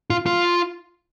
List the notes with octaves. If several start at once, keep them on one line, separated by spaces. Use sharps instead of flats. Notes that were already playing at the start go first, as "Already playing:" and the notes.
F4
F4